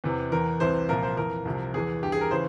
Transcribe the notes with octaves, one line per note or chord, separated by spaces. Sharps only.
E2 C3 E3
E2 E3 A#4
C2 C3 E3 C5
C2 A#2 F3 A#4
C5
F2 E3 A#4
C2 C3 F3
E2 E3 G#4
G2 E3 G4
G#4
A#4
C#3 E3 C5